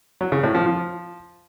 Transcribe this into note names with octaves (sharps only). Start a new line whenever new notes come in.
F#3
C#3
A2
F3
F3